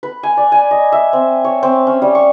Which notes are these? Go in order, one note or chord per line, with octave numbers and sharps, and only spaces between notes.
B4
G#5
D5
G#5
D#5
E5
C4
C#5
C4
C#4
G3
C#6